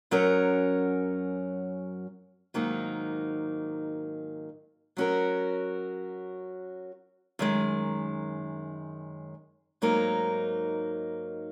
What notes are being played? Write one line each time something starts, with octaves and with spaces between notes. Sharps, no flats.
F#2 F#3 C#4 A#4 C#5
G#2 D#3 F#3 A#3 D#4
F#3 C#4 F#4 A#4
F#2 D#3 G#3
G#2 F#3 A#3 D#4 A#4